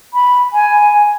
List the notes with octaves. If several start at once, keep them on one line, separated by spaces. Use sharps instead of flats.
B5
G#5